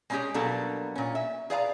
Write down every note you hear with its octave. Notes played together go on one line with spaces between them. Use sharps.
G#3 A#3 C#4 D#4 G4 G#4
B2 F#3 G3 A#3 D4 A4
A#2 C#4
E5
G#4 B4 D5 F5 G#5 A#5